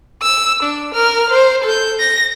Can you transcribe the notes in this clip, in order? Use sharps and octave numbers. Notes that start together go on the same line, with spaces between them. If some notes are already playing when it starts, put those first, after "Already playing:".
E6
D4
A#4 F6
C5
A4 G6
A#6